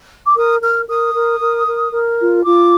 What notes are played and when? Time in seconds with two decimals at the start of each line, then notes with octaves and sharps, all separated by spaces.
0.25 D6
0.36 A#4 D#6
0.61 A#4 F6
0.88 A#4 D#6
1.14 A#4
1.40 A#4
1.66 A#4
1.92 A#4
2.19 F4
2.44 F4 D6